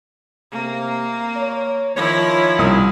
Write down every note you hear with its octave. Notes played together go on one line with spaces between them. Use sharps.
C3 A#3
C#5
D#3 F3 E4 C#5
C2 D#6